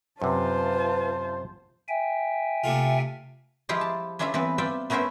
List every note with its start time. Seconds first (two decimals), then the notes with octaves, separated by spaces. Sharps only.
0.22 F#2 C3 F4 B4 C5 A5
1.88 E5 G5 G#5
2.64 C3 A3 F4
3.69 F3 G#3 E4 F4 G4 G#4
3.81 A5
4.19 C#4 D4 E4 F4 A4 E5
4.34 E3 B3 C4 B4
4.58 F4 D5 E5 G5
4.90 A3 B3 C#4 A#4 C5 E5